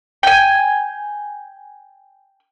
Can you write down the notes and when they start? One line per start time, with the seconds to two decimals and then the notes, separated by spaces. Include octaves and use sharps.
0.23 G5 G#5